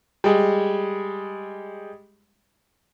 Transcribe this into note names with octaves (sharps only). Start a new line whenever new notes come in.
G3 G#3